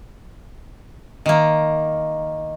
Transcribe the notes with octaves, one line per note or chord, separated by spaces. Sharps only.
D#3 A#3